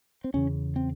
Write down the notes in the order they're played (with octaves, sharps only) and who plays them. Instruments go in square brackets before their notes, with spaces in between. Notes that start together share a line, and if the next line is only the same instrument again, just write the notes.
[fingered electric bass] C4
E2 C#3 C#4
C4